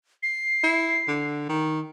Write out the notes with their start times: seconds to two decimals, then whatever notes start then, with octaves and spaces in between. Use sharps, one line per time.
0.23 C7
0.64 E4
1.08 D3
1.49 D#3